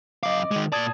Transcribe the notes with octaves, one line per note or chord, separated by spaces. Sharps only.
F#2 D#5 F5 D6
D#3 G#3
A#2 D5 A5 D#6 G#6